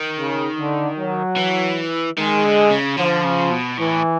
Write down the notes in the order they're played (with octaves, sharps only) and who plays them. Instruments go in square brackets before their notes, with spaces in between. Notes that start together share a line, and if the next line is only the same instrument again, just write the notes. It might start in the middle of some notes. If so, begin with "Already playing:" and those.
Already playing: [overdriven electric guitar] D#3
[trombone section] C#3
D3
F#3
[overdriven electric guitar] E3
[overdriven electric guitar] D#3 [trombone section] G#3
[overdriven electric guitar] D3
C#3
[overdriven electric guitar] D3 [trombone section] F3
[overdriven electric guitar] C#3
B2
[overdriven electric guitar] A2 [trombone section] E3